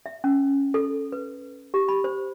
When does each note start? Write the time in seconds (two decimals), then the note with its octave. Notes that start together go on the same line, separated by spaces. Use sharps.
0.06 E5
0.24 C#4
0.74 A4
1.12 B4
1.74 G4
1.88 B5
2.04 C5